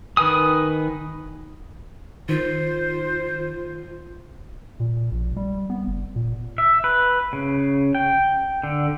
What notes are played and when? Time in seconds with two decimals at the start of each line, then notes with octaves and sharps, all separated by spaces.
0.17 D#3 B4 G#5 D#6
2.29 D#3 F4 C5
4.80 A#2
5.11 A#1
5.37 G3
5.70 B3
5.87 F#1
6.16 A#2
6.58 E5
6.84 B4
7.33 C#3
7.95 G5
8.63 D3